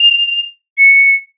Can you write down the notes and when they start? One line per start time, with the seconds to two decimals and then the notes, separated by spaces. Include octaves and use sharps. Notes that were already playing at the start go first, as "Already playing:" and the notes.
Already playing: F7
0.78 C#7